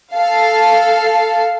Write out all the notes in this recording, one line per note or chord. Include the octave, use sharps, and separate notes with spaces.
A4 F5